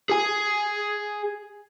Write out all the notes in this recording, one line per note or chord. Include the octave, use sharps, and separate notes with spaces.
G#4 G#5